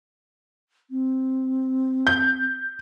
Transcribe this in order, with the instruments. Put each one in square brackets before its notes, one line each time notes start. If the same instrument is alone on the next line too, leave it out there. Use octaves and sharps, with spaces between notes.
[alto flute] C4
[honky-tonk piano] G6